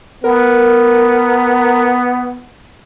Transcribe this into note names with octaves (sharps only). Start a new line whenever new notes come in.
B3 A#4